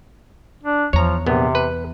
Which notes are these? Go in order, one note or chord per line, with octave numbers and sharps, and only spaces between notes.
D4
E2 F3 C#5 A#5
A#1 C3 B3
B4